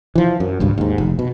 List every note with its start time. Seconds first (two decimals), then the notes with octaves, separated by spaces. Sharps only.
0.15 E3 F3
0.40 F#2
0.60 G#1 C#2 G2
0.78 D#2 G#2
0.98 F1
1.19 B2